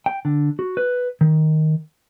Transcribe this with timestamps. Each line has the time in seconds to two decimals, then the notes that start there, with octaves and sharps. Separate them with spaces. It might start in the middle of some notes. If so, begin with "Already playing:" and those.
0.06 G5
0.25 D3
0.59 F#4
0.77 B4
1.21 D#3